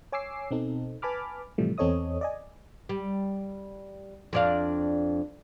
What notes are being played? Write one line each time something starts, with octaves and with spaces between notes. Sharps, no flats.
C#5 G#5 D6 E6 C7
B2 C4 D#4 A4
B4 G#5 A5 B5 D6 F6
A2 C3 E3 F3 G3 A3
E2 C4 A4 C#5 D#5 D#6
D5 D#5 G#5
G3
F2 D4 F5